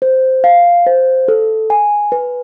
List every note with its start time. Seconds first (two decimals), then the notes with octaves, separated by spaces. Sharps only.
0.02 C5
0.44 F5
0.87 C5
1.28 A4
1.70 G#5
2.12 B4